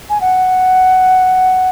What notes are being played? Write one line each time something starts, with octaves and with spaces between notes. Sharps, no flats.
G#5
F#5